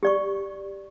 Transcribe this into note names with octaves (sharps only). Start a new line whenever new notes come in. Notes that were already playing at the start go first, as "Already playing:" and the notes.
G4 D5 C#6